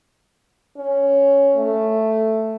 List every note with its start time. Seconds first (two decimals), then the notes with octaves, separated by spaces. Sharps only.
0.77 C#4
1.56 A3